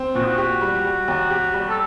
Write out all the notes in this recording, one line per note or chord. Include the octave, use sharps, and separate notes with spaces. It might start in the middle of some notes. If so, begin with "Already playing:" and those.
Already playing: C4
A#2 F#4
D#4
F#4
F#4 G4
G3
G3
D#2
G4
G3
A4